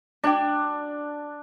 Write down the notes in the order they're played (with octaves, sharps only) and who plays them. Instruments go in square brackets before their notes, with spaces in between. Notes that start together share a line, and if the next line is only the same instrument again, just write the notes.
[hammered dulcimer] D4 [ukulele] F#4 C#5 G5